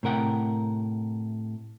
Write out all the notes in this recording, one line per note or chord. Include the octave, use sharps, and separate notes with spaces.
A2 C3 A#4 F#5 G5